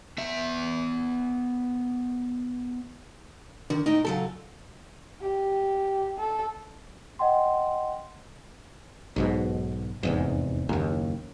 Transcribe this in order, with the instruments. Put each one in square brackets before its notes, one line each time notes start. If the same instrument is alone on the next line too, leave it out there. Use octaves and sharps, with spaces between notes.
[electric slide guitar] B3 E5
[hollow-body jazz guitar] D3 [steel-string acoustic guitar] D#3
[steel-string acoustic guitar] A2 D#5 G5 [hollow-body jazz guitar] D#4
[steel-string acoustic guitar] C#3 F#3 F4 [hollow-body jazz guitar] A4
[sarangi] G4
A4
[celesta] D#5 F#5 G5 C6
[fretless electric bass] B1 G#2 B2
F1 E2 G#2
F#1 D#2